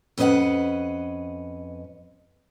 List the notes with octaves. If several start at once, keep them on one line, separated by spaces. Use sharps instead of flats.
F2 C#4 B4 D#5 F5 F#5